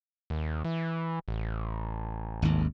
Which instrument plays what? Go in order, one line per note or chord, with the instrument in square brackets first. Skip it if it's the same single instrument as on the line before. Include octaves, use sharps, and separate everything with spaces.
[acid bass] D#2
E3
A1
[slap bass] G#1 D#2